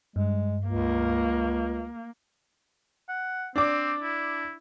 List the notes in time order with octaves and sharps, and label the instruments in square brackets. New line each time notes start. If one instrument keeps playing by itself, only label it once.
[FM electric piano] G2 [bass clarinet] G#3
[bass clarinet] C#2 [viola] A#3
[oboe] F#5
[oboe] C4 [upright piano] D4 D6
[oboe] E4